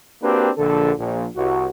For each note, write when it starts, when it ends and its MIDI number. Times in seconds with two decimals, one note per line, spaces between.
0.22 0.50 58
0.22 0.50 60
0.22 0.50 62
0.22 0.50 66
0.22 0.50 67
0.22 0.50 71
0.58 0.92 34
0.58 0.92 50
0.58 0.92 69
0.99 1.26 34
1.36 1.67 36
1.36 1.67 66